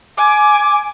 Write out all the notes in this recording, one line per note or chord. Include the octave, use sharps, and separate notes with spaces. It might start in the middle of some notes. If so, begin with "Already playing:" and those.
G#5 D6